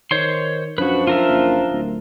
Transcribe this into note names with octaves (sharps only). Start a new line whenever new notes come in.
D#3 C5 C#5 C6
F#2 F3 D4 F#4 B4
F4 A#4 E5
F#1
D1